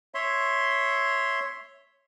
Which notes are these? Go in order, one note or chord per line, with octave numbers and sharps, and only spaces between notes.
C#5 E5 C6